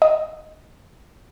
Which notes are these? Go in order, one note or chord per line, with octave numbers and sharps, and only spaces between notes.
D#5